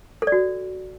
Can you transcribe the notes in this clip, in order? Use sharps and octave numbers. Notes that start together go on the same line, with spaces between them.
A4
D5
F#4